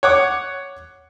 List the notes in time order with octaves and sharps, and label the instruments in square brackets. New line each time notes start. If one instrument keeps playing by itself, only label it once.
[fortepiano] C#5 F#5 D6